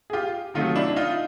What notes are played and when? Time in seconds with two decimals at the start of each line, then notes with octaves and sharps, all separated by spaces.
0.10 G#4
0.13 F4 G4
0.54 C3 D#3 F#3 A3 D#4 F4
0.76 D4 E4
0.96 D#4 F4